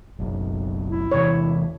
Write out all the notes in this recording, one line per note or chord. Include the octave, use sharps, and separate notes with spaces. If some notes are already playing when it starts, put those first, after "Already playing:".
F#1 B1 F#2
E4
E2 C3 E3 C#5